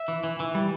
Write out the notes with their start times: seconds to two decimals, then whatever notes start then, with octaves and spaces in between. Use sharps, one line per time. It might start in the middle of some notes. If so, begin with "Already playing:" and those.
Already playing: E5
0.08 E3
0.24 E3
0.40 E3
0.55 G3